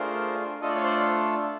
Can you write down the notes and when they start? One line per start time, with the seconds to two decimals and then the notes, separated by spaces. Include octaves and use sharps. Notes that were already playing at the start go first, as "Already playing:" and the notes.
Already playing: A3 D4 F4 G#4 A#4 C5
0.61 A3 D4 F4 A4 D#5
0.69 D5
0.75 C#5
0.83 C5 D5